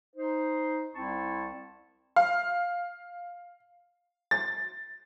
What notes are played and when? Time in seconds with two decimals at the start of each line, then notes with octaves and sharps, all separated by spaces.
0.15 D#4 C5
0.95 C2 C4 E4 A5 C#6
2.16 F5
4.31 A6